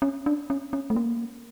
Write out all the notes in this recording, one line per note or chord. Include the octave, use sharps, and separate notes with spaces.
C#4
D4
C#4
C#4
A3
A#3